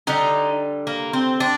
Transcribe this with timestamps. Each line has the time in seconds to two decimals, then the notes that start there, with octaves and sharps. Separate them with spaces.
0.07 D3 G3 D#4
0.87 A#3
1.13 C4
1.40 D4